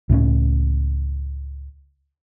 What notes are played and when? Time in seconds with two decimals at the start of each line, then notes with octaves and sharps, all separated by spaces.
0.09 C#2 A2 F3 C#4